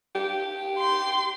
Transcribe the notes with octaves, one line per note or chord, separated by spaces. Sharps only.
G4
C6